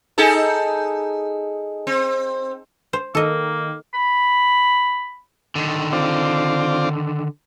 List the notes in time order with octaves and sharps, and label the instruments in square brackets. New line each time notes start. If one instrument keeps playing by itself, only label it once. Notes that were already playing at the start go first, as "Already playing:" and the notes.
[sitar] D#4 G#4 A4
C4
[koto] C5
[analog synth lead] D#3 [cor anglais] A#3 [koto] A4 D#5
[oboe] B5
[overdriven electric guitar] D3 D#3
[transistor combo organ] C4 F4 D5